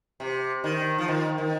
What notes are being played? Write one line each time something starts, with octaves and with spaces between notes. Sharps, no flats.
C3
D#3
F3
D#3
D#3